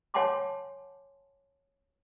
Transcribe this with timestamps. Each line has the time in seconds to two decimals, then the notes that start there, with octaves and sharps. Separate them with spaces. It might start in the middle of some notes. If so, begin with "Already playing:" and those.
0.14 C#5 F#5 G#5 A5 C6 D6